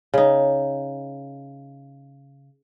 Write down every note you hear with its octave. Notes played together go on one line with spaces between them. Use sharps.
C#3 D#4